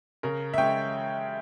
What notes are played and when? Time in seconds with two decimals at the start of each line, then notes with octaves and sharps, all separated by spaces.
0.23 C#3 A#4
0.54 E5
0.58 G#3 C#4 G5